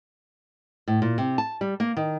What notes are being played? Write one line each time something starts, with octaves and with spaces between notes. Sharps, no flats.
A2
A#2
C3
A5
G3
A#3
D#3